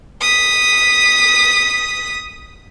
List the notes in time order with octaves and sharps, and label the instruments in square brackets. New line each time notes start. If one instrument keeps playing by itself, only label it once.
[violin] D#6 B6